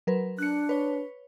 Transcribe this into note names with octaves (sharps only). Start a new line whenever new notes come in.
F#3 A#4 B4
D4 F#6 C#7
B4 C#5